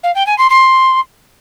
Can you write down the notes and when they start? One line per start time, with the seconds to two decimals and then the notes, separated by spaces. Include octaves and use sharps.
0.03 F5
0.15 G5
0.26 G#5
0.38 C6
0.50 C6